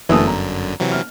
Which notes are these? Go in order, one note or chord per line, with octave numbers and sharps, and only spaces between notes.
G1 F#2 D3 E3 A3 D#6
A#5
C3 E3 F#3
F6